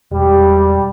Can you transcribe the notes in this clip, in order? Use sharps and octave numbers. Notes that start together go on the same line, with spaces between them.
E1 G3